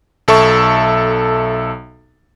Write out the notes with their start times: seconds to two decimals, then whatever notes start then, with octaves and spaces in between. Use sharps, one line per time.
0.28 B1 A4 E5 C#6